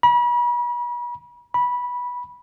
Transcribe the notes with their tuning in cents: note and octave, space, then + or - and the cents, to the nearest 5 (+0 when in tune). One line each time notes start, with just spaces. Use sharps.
B5 -40
B5 -15